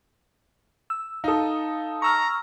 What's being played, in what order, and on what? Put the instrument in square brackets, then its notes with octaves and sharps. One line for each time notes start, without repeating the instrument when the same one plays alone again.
[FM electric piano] E6
[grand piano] D#4 A4 [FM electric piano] F5 D#6
[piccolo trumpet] A#5 [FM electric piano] C#6 E6 F6